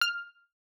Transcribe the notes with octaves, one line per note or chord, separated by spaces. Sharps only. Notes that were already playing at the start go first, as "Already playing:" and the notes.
F6